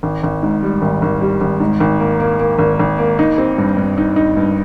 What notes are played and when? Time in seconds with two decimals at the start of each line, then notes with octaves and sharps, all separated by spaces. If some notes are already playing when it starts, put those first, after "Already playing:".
0.03 G#1
0.23 G#1
0.43 G#2
0.63 G3
0.82 G#1
1.02 G#1
1.21 G3
1.41 G#1
1.60 G#2
1.80 G#1
2.00 A#3
2.20 A#3
2.39 A#3
2.59 G#1
2.79 G#1
2.98 A#3
3.19 D#4
3.38 C4
3.58 G2
3.77 G2
3.98 D#4
4.16 D#4
4.37 G2